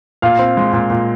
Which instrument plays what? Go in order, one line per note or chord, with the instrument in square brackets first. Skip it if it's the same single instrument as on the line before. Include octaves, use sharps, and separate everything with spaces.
[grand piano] A#2 [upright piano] F5
[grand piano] C4
G#3
A#2
A#2